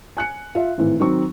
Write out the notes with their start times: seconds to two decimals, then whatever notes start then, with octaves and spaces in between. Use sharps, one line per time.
0.17 G#5 F#6 C#7
0.55 F4 E5
0.78 G#1 A2 E3
1.00 D#3 F#3 C4 C#6